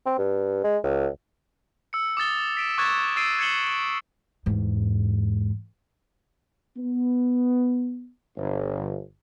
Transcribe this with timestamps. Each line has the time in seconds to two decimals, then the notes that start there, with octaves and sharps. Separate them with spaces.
0.06 C4
0.18 G2
0.64 G#3
0.84 C#2
1.93 E6 C#7
2.17 D6 D#6 A6 G7
2.57 B6 D7 E7
2.78 C#6 D6 F#6 G#6 A6 E7
3.16 E6 A6 C7 D7 D#7
3.39 G#6 C7 C#7 E7 F#7 G7
4.46 E2 G#2
6.76 B3
8.37 G1